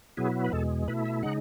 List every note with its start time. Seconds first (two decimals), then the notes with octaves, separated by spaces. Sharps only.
0.17 B2 F#3 B3 E4 G#4
0.44 B4
0.53 E2 B2 G#3 A4
0.88 B2 A3 E4 B4
1.05 E5
1.23 C#3 G#3 D#4 F#5